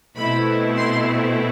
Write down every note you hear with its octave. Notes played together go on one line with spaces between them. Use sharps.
B2 A3 C4 E4 B5
C6